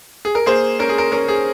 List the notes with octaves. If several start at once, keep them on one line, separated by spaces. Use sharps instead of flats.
G#4
A#4
A#3 G#4 C5
C#4 A#4
G#4
A#4
C#4 A#4
G#4